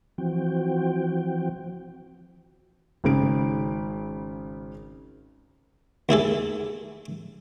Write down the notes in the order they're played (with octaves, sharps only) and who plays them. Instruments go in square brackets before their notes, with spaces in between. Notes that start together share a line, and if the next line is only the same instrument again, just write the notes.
[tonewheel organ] E3 F3 C4 F#4 G5
[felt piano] G#1 C#3 D7
[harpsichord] D#2 E4 G#4 A4